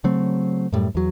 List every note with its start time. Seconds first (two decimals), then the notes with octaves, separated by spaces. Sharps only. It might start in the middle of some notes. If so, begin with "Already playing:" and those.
0.04 C#3 F#3 A3 C4
0.73 F#2 A2 G3
0.95 E2 F#3